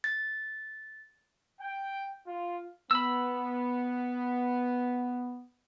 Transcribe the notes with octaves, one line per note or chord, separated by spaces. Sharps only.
A6
G5
F4
B3 B5 E6